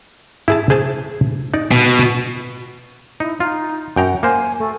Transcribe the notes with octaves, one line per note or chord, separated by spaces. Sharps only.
E4 G#4 A5
G#4 C5 A5
D#4 D5
B2
D#4 E4
D#4 F4
F#2 F#5 G5 A#5
A#3 C5 G#5
A3